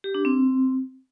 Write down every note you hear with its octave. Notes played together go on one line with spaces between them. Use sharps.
G4
D4
C4